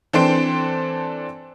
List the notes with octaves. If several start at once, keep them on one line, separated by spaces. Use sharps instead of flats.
E3 C4 D4 A4 C6 D7